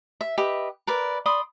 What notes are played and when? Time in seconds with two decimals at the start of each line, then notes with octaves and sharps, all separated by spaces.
0.21 E5
0.38 G4 B4 D#5 E5
0.87 A#4 B4 D5
1.26 D5 B5 C6 D#6